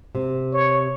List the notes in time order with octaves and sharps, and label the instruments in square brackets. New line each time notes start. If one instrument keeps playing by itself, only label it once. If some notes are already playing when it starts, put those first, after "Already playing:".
[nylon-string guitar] C3
[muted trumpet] C#5